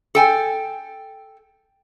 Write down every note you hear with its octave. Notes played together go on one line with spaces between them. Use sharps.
A4 G5 G#5